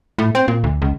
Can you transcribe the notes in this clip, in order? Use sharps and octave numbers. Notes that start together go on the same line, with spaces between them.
A2
C4
A#2
D2
C#2